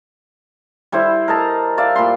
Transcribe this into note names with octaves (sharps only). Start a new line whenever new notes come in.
G3 E4 C5 E5
A#4 D#5 A5 A#5
G4 D5 E5 F5
A#2 B5 C6